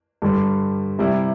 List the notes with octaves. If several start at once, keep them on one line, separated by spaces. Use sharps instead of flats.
G2 D3 G3
C3 G3 E4